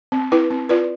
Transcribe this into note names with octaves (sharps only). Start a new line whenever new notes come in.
C4
E4 B4
C4
F4 B4 D5